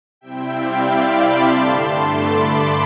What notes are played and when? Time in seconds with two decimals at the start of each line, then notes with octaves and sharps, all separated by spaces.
0.21 C3 G3 C4 E4 E5 G5
0.53 D5 F5
0.85 B5 D6
1.17 A5 C6
1.49 G2 D3 A3 A5 C6
2.13 B5 D6
2.45 A5 C6